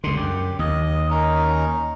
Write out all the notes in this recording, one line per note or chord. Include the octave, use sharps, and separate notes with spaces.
C#2 D3 C6
F#2 G4
D#2 D#5
C#4 D#4 A#4